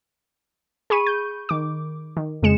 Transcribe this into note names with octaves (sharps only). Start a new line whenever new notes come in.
G#4 B5 C#6 D#7
G6
D#3 D6
D#3
F2 C#3 G#3 C#7 E7